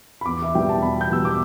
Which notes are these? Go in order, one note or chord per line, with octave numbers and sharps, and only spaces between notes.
B5
E2 D6
E5
B2 G3 B3 G5
A5
E2 B5
G6
B2 G3 B3 E6
D6